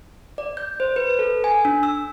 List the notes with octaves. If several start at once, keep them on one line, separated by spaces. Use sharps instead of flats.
D5
G6
C5
B4
A4
G#5
D4
E6